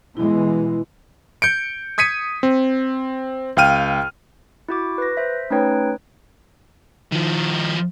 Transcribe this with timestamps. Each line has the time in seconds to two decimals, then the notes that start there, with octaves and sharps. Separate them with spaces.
0.17 B2 E3 G#3 E4
1.42 G6 C#7 D7
1.98 D#6 G#6 B6 C#7 D#7
2.43 C4
3.57 C#2 F5 G5 F6 D#7
4.69 E4 F#4 D6
4.98 B4 A#6
5.17 C5 E5
5.50 A3 C#4 D#4 B4 C#5 G5
7.12 D#3 F3